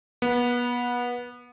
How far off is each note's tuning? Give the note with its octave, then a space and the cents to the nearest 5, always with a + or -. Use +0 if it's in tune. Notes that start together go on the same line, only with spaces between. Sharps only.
B3 -25